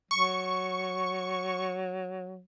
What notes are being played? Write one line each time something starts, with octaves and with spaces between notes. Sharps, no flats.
F#3 C#6